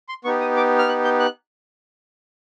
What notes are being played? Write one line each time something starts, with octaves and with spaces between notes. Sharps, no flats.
C6
B3 D#4 G4 C#6
D#6
D6
F6
F#6
G6
F#6